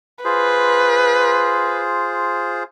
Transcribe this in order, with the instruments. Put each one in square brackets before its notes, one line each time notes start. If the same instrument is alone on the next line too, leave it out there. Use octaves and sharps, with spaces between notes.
[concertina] F4 G#4 C5 [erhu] B4